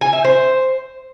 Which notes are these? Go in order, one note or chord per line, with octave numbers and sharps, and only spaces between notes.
G#5
E5
C5